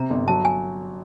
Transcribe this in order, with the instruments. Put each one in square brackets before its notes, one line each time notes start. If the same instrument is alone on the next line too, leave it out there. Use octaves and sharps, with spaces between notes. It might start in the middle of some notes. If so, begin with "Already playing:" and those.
Already playing: [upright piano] C3 [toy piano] A#5
[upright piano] G1
[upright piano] F#3 [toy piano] A5
[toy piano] G#5